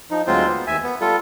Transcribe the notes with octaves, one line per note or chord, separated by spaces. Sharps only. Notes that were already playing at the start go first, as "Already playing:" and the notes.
F3 D#4
D2 F#3 G#3 C4 F4 C5
B3
D#2 E5 G#5
B3
G3 F4 A4